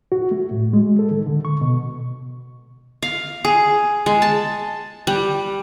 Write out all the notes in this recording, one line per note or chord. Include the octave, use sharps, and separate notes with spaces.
F#4
A3
A2
G#3
A4
D#3
D3
C#6
B2
F5
G#4
G#3
A5
G3